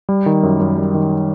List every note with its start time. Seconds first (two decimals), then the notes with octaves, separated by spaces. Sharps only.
0.09 G3
0.26 D#3
0.43 F#2
0.60 F#2
0.77 G3
0.95 D#3